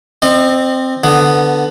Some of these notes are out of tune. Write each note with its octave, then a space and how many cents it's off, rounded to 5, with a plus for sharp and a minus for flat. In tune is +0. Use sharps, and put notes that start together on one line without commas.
C4 +0 D#5 -40
D3 +0 B3 +5